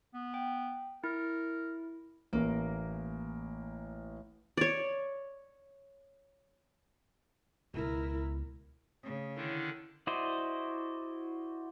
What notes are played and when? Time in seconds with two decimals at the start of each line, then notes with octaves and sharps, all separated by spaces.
0.14 B3
0.34 G5
1.04 E4 A#4
2.33 A1 A#3 A#4
4.57 C#5 D5
7.74 C#2 B2 E4 A#4
9.03 C#3 A3 D#6
9.37 D3 D#3 D4 E4
10.07 E4 F#4 C5 D5 D#5